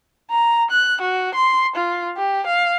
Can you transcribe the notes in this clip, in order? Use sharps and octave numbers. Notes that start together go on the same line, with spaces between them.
A#5
F#6
F#4
C6
F4
G4
F5